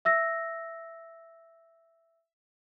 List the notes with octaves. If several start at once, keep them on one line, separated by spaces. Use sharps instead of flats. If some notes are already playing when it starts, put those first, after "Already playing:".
E5 E6 A#6